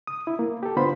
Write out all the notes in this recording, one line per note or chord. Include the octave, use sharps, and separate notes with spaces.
D#6
E4
A#3
G4 A4
D3 B3 F4 C5 B5 C6